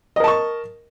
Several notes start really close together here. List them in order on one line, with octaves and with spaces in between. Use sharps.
D#5 A#4 A5 C#6